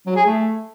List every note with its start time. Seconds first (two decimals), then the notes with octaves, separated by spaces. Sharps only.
0.06 F#3
0.16 G#4
0.26 A3